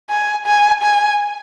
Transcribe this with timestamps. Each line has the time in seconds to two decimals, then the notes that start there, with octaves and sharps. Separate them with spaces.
0.10 G#5
0.46 G#5
0.82 G#5